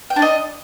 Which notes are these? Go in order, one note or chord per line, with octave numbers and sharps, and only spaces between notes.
G5
D4
D#5